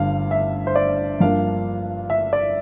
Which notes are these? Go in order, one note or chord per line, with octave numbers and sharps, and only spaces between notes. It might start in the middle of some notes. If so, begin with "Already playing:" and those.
Already playing: G1 G2 D3 G3 F5
E5
C5
D5
G2 F3 A#3 D4 F5
E5
D5